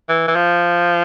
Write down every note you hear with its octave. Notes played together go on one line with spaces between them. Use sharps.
E3
E3
F3